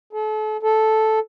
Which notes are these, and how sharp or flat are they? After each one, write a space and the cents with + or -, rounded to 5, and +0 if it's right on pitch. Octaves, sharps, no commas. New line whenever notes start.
A4 -35
A4 -5